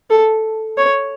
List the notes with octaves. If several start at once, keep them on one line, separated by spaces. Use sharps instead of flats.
A4
C#5